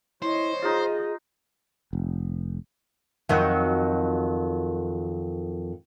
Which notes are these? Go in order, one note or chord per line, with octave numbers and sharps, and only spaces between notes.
E4 C5 C#5 D#5
D#4 F4 G#4 D#5
F1
F2 D#3 F#3